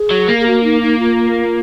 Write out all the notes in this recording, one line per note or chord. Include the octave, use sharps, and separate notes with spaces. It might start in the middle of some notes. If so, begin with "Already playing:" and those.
Already playing: G#4
F#3
A#3
G#4
F#4
D#4
D#4
F4